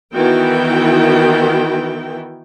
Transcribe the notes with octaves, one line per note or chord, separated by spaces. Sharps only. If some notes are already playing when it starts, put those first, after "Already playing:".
D#3 E3 B3 E4 F#4 G5